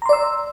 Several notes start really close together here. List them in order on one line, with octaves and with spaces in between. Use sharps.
A#5 C6 D5 E6